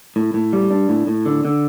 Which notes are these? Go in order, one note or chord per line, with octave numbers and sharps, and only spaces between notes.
A2
A2
G3
D4
A2
A2
D3
D3